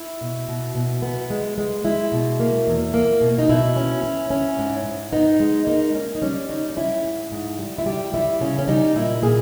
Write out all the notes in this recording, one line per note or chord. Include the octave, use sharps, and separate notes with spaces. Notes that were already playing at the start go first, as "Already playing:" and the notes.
Already playing: E4
B2
B2
B2
B3
G#3
G#3
G#3 E4
B2
A#3
E2
A#3
B2
D#4
B2 E4
C#4
C#4
C#4
G#2
G#2
B3 D#4
G#3
A#3 D#4
C#4
D#4
G3 C#4
C#4 D#4
D#4
C#4 E4
G#2
G#2
G3
E4
G3 G4
G3 E4
C#3 C#4
C#4
G3 D#4
A#2 E4
A#2 G#4